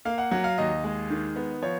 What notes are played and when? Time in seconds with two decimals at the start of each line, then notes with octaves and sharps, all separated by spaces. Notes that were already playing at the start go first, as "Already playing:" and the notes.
0.05 A#3 F5
0.18 F#5
0.31 F#3 F#5
0.44 F5
0.58 D#2 D#5
0.84 G#3
1.10 D#3
1.36 B3
1.62 F3 C#5